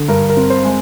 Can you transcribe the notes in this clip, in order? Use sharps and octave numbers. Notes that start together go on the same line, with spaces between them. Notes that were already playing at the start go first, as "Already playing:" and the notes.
Already playing: D3
G2 A#4
A#4
C4
C5
G#3